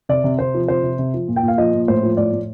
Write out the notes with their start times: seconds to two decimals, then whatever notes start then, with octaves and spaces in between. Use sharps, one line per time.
0.09 C3 D5
0.24 C3
0.39 C3 C5
0.54 F3
0.68 C3 C5
0.83 C3
0.99 C3
1.14 F3
1.28 A#2
1.36 G5
1.43 A#2 F5
1.58 F3 D#5
1.74 A#2
1.88 A2 C5
2.03 F3
2.17 A2 D5
2.32 A2